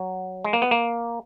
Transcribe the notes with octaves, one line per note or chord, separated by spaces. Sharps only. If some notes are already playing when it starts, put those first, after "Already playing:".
Already playing: F#3
G#3
A#3
B3
A#3